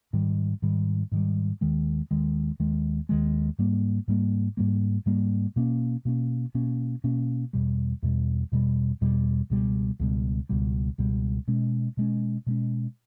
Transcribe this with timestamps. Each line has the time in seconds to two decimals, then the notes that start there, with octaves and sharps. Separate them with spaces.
0.13 G#2 D#3 G3
0.62 G#2 D#3 G3
1.12 G#2 D#3 G3
1.61 D#2 D#3 G#3
2.11 D#2 D#3 G#3
2.60 D#2 D#3 G#3
3.09 D#2 D#3 G#3
3.59 G#2 G3 A#3
4.08 G#2 G3 A#3
4.57 G#2 G3 A#3
5.06 G#2 G3 A#3
5.56 B2 A#3 C#4
6.05 B2 A#3 C#4
6.55 B2 A#3 C#4
7.04 B2 A#3 C#4
7.53 E2 B2 G3
8.03 E2 B2 G3
8.52 E2 B2 G3
9.01 E2 B2 G3
9.50 C#2 B2 G3
10.00 C#2 B2 G3
10.49 C#2 B2 G3
10.98 C#2 B2 G3
11.48 B2 G#3 C#4
11.97 B2 G#3 C#4
12.47 B2 G#3 C#4